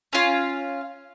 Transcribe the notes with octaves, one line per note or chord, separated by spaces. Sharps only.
C#4 F4